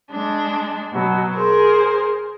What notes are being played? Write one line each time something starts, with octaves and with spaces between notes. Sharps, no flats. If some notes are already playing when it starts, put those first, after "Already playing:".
G#3 D4
B2 F#3
G#4 A#4 C5